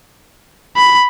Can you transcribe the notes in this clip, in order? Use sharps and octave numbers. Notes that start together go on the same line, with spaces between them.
B5